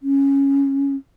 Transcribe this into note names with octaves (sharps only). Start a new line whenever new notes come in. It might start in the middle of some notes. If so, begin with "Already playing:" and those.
C#4